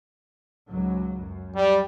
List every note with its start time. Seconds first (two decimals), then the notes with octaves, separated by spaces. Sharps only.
0.69 C#2 G#2 F#3
1.21 F#2
1.56 G3